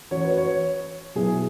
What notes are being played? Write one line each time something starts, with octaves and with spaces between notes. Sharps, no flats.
E3 C#4 F#4 C#5
B4
C#5
B2 F#3 B3 E4 G#4